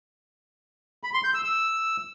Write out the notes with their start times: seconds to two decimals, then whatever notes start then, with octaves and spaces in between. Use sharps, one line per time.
1.03 B5
1.14 C6
1.24 G6
1.34 E6
1.44 E6